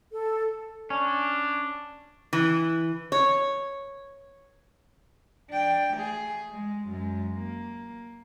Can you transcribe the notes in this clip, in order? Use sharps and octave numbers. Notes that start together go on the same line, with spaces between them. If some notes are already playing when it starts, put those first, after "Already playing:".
A4
C#4 D4
E3
C#5
D4 G5
A3 G#4
G#3
F#2 G#3
A#3